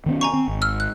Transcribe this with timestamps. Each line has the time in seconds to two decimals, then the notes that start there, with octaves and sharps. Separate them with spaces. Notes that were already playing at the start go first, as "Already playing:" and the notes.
0.06 D#3 B3 C#4
0.21 G#5 A#5 C#6
0.33 C4
0.48 G#1
0.62 E6 F6
0.80 F#6